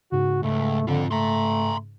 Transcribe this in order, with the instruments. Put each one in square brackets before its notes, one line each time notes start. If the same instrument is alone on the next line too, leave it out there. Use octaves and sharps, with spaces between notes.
[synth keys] G#2 C#3 [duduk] F#4
[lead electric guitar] C#2 [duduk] A3
[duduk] D3 [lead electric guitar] C4 F4
[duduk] A3 [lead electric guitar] A#5 C6